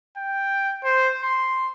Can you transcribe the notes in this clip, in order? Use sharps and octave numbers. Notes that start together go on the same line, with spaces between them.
G5
C5
C6